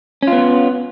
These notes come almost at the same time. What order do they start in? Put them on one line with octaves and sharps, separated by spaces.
C#4 F4 B3